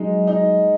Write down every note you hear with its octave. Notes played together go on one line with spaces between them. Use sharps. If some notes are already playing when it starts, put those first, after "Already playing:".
Already playing: F#3 G#3 D#4
D#4